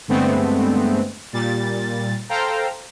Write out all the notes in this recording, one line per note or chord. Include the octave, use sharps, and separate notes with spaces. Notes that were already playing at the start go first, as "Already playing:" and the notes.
G2 D3 G#3 A3 B3 C4
A#2 G3 A6
A4 C5 F5 G5 A#5